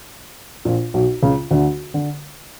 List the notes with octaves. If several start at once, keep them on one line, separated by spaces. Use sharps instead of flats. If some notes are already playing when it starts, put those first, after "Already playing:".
A#1 A#2
B1 B2
C#2 C#3
D2 D3
D3